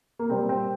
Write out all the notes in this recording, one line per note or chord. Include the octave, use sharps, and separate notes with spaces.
A#3
A#2 G3 C4
C4